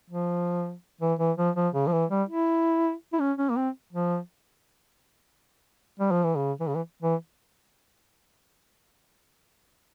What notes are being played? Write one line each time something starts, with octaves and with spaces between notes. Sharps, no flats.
F3
E3
E3
F3
F3
C#3
F3
E3
G3
E4
E4
C#4
C#4
A#3
C4
F3
G3
F3
E3
C#3
E3
C#3
E3
E3